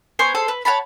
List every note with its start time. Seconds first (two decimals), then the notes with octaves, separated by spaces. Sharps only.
0.19 B3 C5 G#5 C#6
0.35 G#4 A4 C5
0.48 B4
0.65 C#5 F#5 A5 B5